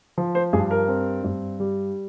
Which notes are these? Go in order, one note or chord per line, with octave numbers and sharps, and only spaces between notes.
F3
C5
G2 G#4
A#4
C4
G2
G3